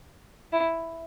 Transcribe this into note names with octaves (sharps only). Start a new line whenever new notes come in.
E4